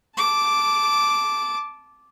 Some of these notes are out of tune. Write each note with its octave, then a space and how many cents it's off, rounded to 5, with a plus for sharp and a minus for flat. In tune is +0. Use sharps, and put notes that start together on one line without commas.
A5 -15 D6 -5